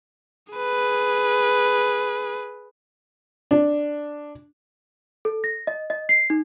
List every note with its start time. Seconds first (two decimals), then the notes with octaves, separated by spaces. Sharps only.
0.53 G#4 B4
3.51 D4
5.25 A4
5.44 A#6
5.67 D#5
5.90 D#5
6.09 C7
6.30 D#4